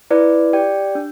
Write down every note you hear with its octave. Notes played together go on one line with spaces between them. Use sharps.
E4 B4 D5
G4 D5 G5
D4